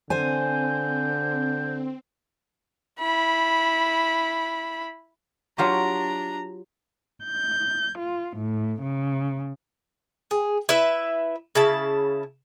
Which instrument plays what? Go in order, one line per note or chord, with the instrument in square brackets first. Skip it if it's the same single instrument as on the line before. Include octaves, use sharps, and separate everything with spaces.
[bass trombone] D3 [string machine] C4 [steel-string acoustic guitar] C5 G#5 [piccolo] G6
[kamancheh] E4 B5
[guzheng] F#3 F4 G4 [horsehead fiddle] D4 A#5
[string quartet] G6
F4
A2
C#3
[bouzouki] G#4
E4 B4 E5
C#3 E4 A5